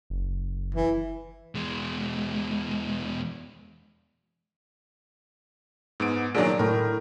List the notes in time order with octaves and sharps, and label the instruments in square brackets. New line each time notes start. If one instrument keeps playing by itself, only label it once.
[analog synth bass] F#1
[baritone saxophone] E3
[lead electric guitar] E2 G#3
[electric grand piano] G#2 B3 D7
[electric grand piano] A#2 D#3 F#3 [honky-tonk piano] D4 G#4 D7
[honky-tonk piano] A2 [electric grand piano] A#4